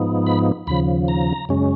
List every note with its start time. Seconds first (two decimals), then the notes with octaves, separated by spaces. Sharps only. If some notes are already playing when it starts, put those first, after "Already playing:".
Already playing: G#2 F3 B3 D#4
0.27 B5
0.67 D#2 C#3 F3 B5
1.08 A#5
1.49 F#2 C#3 G#3 C#4